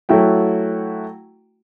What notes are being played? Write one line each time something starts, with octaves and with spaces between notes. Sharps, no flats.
F#3 A3 E4 F#4 G5